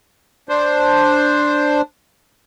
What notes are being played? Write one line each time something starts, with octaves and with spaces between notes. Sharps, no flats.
D4 C5